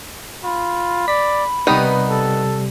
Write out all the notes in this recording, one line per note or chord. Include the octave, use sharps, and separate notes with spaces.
F4 B5
D5 B6
C3 D#3 G3 B3 D#4 B4
A4